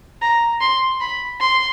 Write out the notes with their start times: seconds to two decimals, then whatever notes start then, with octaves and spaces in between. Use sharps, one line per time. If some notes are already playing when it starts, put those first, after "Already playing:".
0.22 A#5
0.61 C6
1.01 B5
1.40 C6